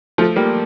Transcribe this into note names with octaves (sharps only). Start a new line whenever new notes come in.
F3 A3
G3 A#3